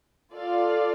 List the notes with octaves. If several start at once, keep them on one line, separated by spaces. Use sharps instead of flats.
F4 A4 D5 F5